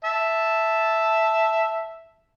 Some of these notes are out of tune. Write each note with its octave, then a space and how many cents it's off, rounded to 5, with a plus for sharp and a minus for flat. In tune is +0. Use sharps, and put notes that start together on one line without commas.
E5 +0 A5 -5